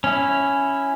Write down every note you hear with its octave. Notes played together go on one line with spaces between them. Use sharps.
C#4 E4